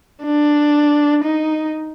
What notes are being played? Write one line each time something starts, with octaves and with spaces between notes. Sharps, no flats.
D4
D#4